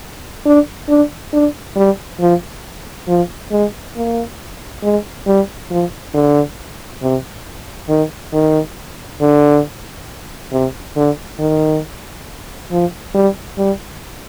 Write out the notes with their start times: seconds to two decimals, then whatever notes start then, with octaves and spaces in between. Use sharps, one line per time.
0.46 D4
0.89 D4
1.33 D4
1.76 G3
2.20 F3
3.08 F3
3.51 G#3
3.96 A#3
4.83 G#3
5.27 G3
5.71 F3
6.14 D3
7.02 C3
7.89 D#3
8.33 D#3
9.21 D3
10.52 C3
10.96 D3
11.39 D#3
12.71 F3
13.15 G3
13.58 G3